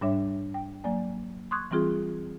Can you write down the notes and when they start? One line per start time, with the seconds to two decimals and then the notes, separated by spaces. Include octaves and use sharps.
0.01 G#2 G3 D4 C#5 E5
0.54 G5
0.84 F#3 A#3 D5 G#5
1.51 C6 C#6 D#6 F#6 G#6
1.71 E3 G3 C4 F4 G#4